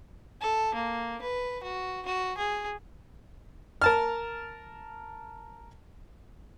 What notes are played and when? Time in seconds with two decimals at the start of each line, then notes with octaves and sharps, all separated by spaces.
0.41 A4
0.74 A#3
1.21 B4
1.63 F#4
2.06 F#4
2.38 G#4
3.82 A#4 A5 F6